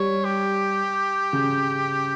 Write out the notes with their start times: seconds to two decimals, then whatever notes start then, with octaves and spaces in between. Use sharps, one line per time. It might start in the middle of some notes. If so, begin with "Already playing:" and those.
Already playing: G3 C#5
0.25 G4
1.33 C#3